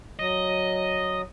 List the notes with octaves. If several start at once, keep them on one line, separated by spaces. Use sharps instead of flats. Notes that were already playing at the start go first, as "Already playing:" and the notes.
F#3 D#5